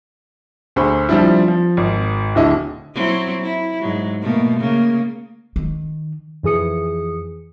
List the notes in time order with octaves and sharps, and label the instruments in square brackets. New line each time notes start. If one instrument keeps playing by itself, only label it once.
[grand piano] D2 D3 G#4 C5 B5 C#6
F3 G3 C4 D4 E4
F3
G#1
D1 D3 E4 D#5
[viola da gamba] F#3 C4 E4
E4
G#2 F#3
B2 A3 A#3
C#3 A#3
[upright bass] D#3
[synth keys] F2 E3 G#4 D#6 C#7